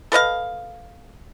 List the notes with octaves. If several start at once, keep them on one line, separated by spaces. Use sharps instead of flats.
A4 B4 D#5 F5